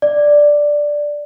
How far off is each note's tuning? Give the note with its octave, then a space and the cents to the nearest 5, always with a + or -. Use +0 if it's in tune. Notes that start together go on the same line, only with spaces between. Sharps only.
D5 +0